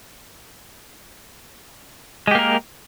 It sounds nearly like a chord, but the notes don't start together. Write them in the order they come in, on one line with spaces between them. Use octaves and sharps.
G#3 G4 A#3 A#4